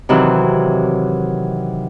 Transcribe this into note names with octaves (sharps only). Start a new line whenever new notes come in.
C3 D#3 E3 F#3